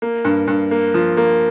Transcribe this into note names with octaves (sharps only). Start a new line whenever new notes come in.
A#3
G2
G2
A#3
F3
A#3